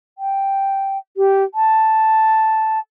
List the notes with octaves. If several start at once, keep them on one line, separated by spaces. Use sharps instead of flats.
G5
G4
A5